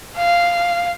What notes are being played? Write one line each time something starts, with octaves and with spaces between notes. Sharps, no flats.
F5